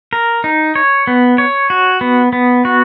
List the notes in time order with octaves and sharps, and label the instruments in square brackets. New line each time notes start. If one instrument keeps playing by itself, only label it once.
[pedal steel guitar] A#4
D#4
C#5
B3
C#5
F#4
B3
B3
F#4